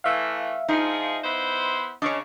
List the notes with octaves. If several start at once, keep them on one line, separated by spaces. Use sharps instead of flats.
E3 A3 E5 F5
F3 D#4 G#4
B3 E4 C5
C#3 D4 C#5 D#5